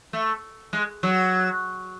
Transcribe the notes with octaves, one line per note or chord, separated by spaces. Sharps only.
A3
G#3
F#3